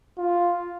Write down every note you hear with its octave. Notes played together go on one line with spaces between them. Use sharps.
F4